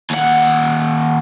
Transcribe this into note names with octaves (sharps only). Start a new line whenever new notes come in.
D#2 F#5